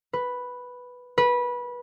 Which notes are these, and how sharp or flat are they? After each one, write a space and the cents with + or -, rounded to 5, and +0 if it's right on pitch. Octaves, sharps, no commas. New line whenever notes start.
B4 +0
B4 -20